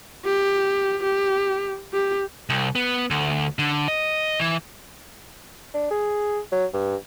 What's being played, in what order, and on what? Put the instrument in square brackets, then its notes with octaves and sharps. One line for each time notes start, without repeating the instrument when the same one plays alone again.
[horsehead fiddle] G4
G4
G4
[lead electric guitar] C2
B3
D2
D3
D#5
E3
[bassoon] D4
G#4
F#3
G2